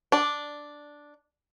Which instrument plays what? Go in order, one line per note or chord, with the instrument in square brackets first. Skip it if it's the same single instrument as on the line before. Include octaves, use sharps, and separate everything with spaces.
[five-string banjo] D4 D5